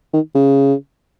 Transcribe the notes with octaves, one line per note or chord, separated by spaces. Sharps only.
D#3
C#3